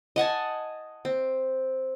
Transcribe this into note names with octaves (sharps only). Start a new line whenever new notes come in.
D#5 F#5 G#5 A5
C4